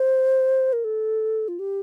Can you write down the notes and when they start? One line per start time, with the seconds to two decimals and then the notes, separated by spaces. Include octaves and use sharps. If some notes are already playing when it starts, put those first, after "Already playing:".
Already playing: C5
0.73 A#4
0.84 A4
1.48 F4
1.59 G4